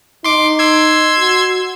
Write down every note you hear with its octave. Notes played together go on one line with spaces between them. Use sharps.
D#4 C6 D6
C6 E6 G#6
F#4